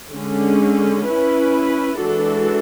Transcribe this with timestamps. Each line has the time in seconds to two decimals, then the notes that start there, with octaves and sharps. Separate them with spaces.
0.13 D3 G#3 C#4
1.07 C#4 E4 B4
1.99 E3 G#3 D4 F#4 A4